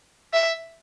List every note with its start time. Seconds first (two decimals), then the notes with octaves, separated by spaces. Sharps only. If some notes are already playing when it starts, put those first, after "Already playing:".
0.34 E5